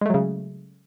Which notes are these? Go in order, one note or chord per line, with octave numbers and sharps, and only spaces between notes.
C#3 F#3 G#3 A3